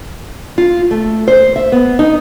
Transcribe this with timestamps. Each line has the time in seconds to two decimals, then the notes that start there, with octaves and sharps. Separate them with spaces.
0.58 F4
0.91 A3
1.28 C5
1.56 E5
1.72 B3
1.99 D#4